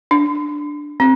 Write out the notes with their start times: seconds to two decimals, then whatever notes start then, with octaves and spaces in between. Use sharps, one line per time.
0.11 D4
1.00 C4